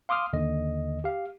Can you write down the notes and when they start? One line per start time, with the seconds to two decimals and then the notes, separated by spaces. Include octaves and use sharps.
0.09 F5 C6 D6 D#6 F6
0.33 D#2 D3 D#5
1.04 G4 F5